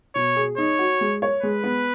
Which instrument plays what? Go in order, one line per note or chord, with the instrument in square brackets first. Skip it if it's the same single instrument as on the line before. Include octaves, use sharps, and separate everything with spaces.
[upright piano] B2 [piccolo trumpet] C#5
[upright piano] G#4
[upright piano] D#4 [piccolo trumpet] C#5
[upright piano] F#4
G#3
C#5
[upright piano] G#3 [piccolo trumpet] B4
[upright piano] B3